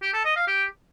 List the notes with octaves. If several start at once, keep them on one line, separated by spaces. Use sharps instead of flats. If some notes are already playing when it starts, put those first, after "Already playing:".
G4
A4
D#5
F5
G4